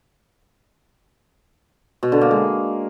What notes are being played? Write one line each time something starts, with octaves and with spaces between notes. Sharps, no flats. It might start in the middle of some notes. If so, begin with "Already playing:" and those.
B2
D3
A#3
G#3